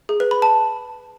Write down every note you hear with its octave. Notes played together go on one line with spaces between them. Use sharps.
G#4
B4
B5
A5